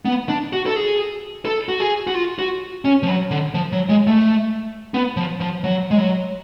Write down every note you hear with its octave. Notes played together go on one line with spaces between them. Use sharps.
B3
D4
F#4
A4
G#4
A4
F#4
G#4
F#4
F4
F#4
C#4
F3
F#3
D3
F3
F#3
G#3
A3
B3
F3
F3
F#3
G#3
F#3